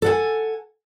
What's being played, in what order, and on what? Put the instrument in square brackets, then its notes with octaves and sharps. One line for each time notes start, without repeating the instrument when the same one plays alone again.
[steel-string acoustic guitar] A4 F#5 G#5